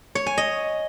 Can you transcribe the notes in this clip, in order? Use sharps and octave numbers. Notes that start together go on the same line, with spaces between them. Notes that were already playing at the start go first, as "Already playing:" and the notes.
C#5
G#5
D#5